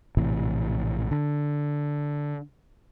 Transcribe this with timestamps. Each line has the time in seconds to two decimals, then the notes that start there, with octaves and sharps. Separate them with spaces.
0.17 A#1 A2 C3 E3
1.11 D3